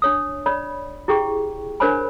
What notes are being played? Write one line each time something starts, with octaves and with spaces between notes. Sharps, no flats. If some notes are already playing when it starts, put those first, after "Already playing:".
D4 C#5 D#6
C#5 D5 B5
E4 G4 G#4 G5 C#6
D4 A#4 C5 C#5 G#5 B5